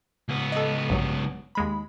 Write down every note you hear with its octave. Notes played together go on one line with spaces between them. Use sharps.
C#2 B3
A4 D#5
A#1 G2 F#3
D#2 G#3 B5